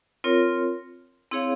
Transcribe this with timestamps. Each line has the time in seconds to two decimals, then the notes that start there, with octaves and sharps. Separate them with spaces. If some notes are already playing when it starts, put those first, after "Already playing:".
0.24 C4 F4 A#4 C#5
1.31 C4 E4 G#4 C#5 F5